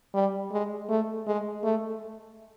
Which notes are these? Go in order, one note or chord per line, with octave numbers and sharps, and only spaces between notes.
G3
G#3
A3
G#3
A3